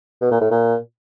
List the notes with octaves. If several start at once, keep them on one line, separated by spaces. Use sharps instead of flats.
B2
A#2
A2
A#2